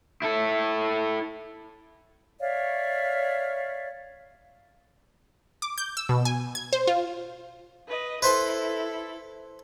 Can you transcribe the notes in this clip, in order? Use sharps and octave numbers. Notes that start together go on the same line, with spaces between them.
E4 A4
C#5 D5 E5 F5
D6
G6
E6
B2
G#5
G#6
C5
F4
B4 D#5
E4 A4 B4 C5 C6